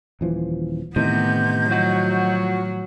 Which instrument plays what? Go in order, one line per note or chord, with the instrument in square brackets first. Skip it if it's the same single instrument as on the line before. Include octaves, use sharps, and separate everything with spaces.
[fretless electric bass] D#1 E3 F3
[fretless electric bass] A2 D#3 E3 [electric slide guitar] C3 [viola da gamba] B3 [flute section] D#5 G6
[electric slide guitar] F3 F#4 [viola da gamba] F#3